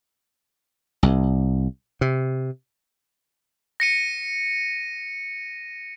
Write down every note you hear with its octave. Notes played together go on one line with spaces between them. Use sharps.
C2
C3
A#6 C#7 D#7